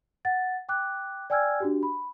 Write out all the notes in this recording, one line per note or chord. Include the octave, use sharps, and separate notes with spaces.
F#5 A6
G5 D6 F#6
D5 G5 G#5 E6 F6 G#6
D4 F#4 G4
B5